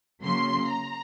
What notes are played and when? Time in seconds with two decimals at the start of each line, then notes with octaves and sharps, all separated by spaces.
0.23 C#3 F#3 A#3 C6
0.69 A#5